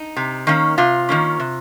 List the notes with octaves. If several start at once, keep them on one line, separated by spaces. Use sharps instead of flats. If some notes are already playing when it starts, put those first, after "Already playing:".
Already playing: D#4
C3
D#3 A#3 C#4
C3 F4
D#3 A#3 C#4
C3